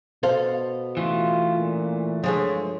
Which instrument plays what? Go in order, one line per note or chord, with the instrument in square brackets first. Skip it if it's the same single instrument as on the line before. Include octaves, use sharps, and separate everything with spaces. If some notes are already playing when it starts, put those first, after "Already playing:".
[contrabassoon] B2 [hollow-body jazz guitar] A4 C5 F5
[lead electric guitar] E3 A3 [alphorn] F4
[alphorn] A#2
[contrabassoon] G2 [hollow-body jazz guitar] F3 G#3 A3 [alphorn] C#5